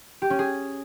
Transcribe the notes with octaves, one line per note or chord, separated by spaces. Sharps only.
G4
C#4
G#4